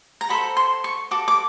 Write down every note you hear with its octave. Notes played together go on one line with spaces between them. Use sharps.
A#5
F#4 A4 C5 B5
C6
C#6
F#4 A4 D6
D6